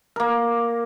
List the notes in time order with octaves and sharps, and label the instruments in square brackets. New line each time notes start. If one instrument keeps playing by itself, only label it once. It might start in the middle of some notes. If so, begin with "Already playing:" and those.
[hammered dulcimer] A#3 A#4